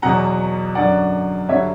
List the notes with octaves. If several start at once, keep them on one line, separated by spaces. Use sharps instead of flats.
E2 B2 F#3 F#5 A#5
F#2 D3 F#3 D5 F#5
G2 D3 F#3 C#5 E5